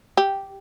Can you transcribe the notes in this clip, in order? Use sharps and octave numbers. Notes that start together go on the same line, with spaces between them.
G4